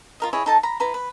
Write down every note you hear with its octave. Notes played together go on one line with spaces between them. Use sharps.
F4 A#4 D#5
E4 G#4 C#5 D#5
D#4 A4 A5
A#5 B5
E4 B4 A#5 C6
B4